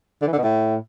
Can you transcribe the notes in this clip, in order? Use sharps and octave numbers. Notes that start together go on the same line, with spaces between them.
D3
E3
D3
B2
A2